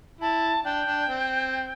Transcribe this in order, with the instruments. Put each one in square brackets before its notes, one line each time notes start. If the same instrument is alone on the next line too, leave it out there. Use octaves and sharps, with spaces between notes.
[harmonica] E4 [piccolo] A5
[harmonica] D4 [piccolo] G5
[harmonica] D4
C4